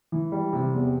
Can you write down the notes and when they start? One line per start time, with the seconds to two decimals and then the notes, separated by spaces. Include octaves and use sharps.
0.12 E3
0.32 G3
0.53 C3
0.73 E2